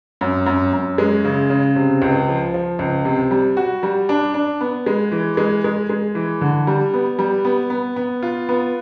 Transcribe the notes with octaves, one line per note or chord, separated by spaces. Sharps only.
F#2
F#2
F#2
G#3
C#3
C#3
C3
C#2
F3
F3
C#2
C3
G3
F#4
G3
D4
D4
B3
G#3
E3
G#3
G#3
G#3
E3
D3
G3
B3
G3
B3
B3
B3
F4
B3